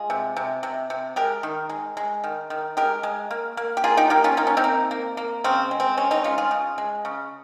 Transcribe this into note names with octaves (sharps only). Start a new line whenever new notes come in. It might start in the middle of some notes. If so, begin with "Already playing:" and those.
Already playing: G#3 F4 G#4
C3
C3
C3
C3
G#3 G4 A#4
D#3
G#3
G#3
D#3
D#3
G#3 G4 A#4
G#3
A#3
A#3
G4
A#3 F4 G#4
D#4 G4
A#3 D#4 G4
C#4 F4
A#3 D#4
C#4
C4 D#4
A#3
A#3
A#3
C#3 C4
G#3
C4
G#3 C#4
C4 D#4
G#3 C#4 F4
F4 G#4
C#3
G#3
C#3